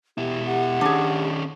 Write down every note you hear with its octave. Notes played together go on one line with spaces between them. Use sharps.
B2 E4 G4
G4 F#5
D#3 C#4 D4 G#4